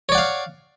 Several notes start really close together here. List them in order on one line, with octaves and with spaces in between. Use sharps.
C#5 D5 F#5 F5